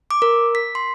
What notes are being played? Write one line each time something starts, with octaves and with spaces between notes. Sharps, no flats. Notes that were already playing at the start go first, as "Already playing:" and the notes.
D6
A#4
B6
C6